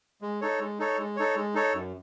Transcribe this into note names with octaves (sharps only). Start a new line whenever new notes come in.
G#3
D#4 A4 C#5
G#3
D#4 A4 C#5
G#3
D#4 A4 C#5
G#3
D#4 A4 C#5
F#2